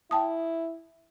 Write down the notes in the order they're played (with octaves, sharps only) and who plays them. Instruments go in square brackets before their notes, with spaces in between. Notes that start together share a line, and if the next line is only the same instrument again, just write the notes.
[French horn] E4 [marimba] G5 A5 D#6